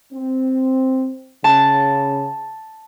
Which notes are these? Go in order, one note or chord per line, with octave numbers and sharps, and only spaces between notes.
C4
C#3 A5